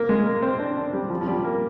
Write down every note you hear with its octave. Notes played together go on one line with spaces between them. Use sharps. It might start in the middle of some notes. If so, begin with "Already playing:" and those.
Already playing: A#3
G#3
A#3
C4
D4
D4
G3
F3
F3
G3
A#3